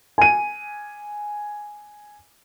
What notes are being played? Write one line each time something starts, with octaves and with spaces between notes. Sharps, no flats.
G#5 D#7